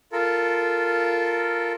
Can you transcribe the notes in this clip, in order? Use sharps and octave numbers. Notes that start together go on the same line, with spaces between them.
F4 A4 A#4